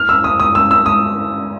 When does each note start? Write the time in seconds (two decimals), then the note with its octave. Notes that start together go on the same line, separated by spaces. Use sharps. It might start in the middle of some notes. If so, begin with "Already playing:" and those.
Already playing: F6
0.09 E6
0.24 D#6
0.40 D#6
0.55 E6
0.71 E6
0.86 D#6